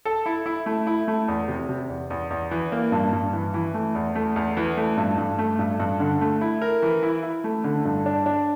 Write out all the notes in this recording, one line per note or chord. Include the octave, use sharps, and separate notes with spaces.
A4
E4
E4
A3
E4
A3
E2
C3
C3
E2
E2
E2
E3
A#3
G2
G2
E3
E3
A3
E2
A3
E2
E3
A3
G2
G2
A3
G2
G2
D3
A3
E4
A#4
E3
E4
E4
A3
D3
G2
D4
D4